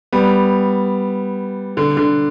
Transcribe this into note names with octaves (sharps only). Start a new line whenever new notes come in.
G3 B3
D3
D3